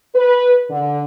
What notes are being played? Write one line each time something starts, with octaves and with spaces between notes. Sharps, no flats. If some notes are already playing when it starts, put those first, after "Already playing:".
B4
D3